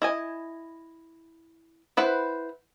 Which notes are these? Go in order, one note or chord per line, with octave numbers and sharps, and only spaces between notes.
E4 D#5 G#5
E4 B4 C5 F#5